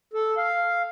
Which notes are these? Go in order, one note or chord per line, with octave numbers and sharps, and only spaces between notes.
A4
F5